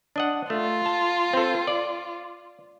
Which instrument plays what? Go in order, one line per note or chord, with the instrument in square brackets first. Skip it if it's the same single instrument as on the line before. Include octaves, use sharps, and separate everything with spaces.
[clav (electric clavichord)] D4 D#5 F#5
[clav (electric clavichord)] A3 [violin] F4
[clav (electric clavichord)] A5
C4 A4
D5